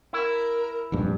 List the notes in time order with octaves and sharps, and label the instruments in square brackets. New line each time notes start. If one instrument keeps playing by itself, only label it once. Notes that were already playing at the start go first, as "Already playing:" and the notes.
[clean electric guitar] E4 [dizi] A#4
[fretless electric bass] F1 A#1 G2